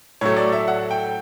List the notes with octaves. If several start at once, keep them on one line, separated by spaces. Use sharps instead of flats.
A2 F#3 A3 C#5
D5
E5
F#5
G5